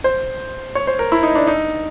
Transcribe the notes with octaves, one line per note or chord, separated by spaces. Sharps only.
C5
C#5
C5
A#4
E4
D#4
D4
D#4